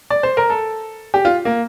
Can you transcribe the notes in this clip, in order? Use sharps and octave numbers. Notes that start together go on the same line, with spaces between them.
D5
C5
A#4
A4
G4
F4
A#3